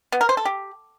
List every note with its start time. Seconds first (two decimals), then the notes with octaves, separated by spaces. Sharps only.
0.12 B3
0.21 A#4
0.29 C5
0.37 A4
0.45 G4